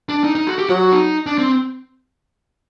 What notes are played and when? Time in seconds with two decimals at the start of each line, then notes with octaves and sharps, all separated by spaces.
0.09 D4
0.24 D#4
0.35 D#4
0.47 F#4
0.58 G4
0.69 F#3 F#4
0.92 D#4
1.26 D4
1.38 C4